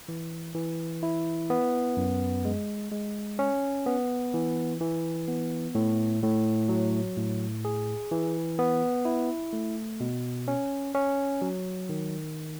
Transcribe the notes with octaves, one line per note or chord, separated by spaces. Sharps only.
E3
E3
E4
B3
F#2
G#3
G#3
C#4
B3
E3
E3
B3
A2
A2
F#3
A2
G#4
E3
B3
E4
A3
B2
C#4
C#4
F#3
D#3